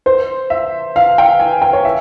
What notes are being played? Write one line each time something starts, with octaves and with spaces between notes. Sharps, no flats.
C5
E5
F5
G5
G#5
G5
C#5
E5